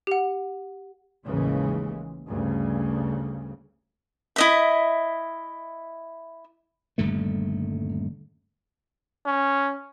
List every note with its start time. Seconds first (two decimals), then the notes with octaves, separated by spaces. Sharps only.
0.07 G4 F#5
1.25 A1 D#2 C#3 E3 G#3
2.27 D2 G2 C#3
4.36 E4 D#5 E5
6.98 D#1 G2 D3 A3
9.26 C#4